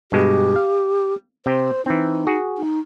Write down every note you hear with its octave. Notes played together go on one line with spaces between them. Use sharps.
G2 B2 G#3 G4
F5
C3 C5 G5
E3 C4 D#4
F#4 G#4
D#4